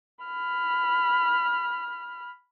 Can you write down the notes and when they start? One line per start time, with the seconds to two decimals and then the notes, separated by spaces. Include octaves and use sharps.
0.24 B5 F6